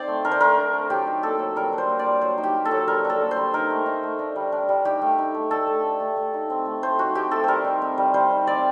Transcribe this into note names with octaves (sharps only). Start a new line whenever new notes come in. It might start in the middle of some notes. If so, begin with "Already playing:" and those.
Already playing: C4 D#4 C5 D5
A3
D4 A#4
C5
A3 A#4
D4
A3
F#3 G4
D#4
A#3 A4
F#3
G3 A#4
D4 C5
A#3
D5
G3
F#3 C5
D#4
G4
A#3
A4
F#3
G3 A#4
D4 A4
A#3
C5
G3
D#4 A#4
A3
D#4
A3
D4
G3
D4
G3
D#4 G4
A3
D#4
A3
D4 A4
A3
D4
A3
A3
D#4
C4
A3
A3 C5
D#4 F#4
C4 G4
A3 A4
G3 A#4 C5
D#4
C4
G3
G3 C5
D#4
C4 D5